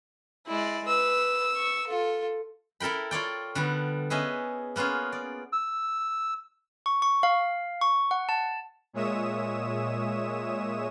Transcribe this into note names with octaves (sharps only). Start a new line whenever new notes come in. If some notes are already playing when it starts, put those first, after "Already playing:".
G#3 E4 D5
B4 E6
C#6
F4 A4
E4 A4 A#4 G5 B5
F4 C#5 D5 G5
D3 G3 B3
B3 C#4 G#4 B4 D#5 E5
A#3 B3 C#4 F4 G#4
D5
E6
C#6
C#6
F5
C#6
F#5
A5
A#2 G#3 C#5 E5 D#6 E7